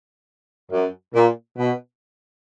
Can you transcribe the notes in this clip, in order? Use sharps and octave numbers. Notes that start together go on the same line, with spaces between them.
F#2
A#2
B2